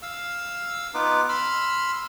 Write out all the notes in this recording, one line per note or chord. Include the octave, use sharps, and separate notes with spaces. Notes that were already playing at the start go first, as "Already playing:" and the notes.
F5 E6
B3 D#4 F4 B4 D6
B5 C6 E6 F6